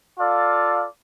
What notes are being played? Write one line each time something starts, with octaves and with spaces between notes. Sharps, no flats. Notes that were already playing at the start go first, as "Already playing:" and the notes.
F4 A4 D5 F5